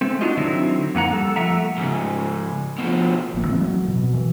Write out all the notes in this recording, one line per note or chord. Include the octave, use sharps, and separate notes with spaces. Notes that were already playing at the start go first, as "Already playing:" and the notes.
G#3 A3 C4
D4 D#4 F4 F#4 D#5
D3 D#3 F#3 C4 D#4 E4
F2 A#3 F#5 A#5
G3 A4
F3 A3 A#3 E5 F#5 A#5
G#2 C#3
B2 F3
A1 A#3
E3 G#3 C4
F#3
B2
E3